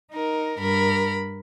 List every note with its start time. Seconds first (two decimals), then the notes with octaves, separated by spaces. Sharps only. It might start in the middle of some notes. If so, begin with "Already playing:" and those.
0.12 D#4 A#4
0.60 G2 A#4 B5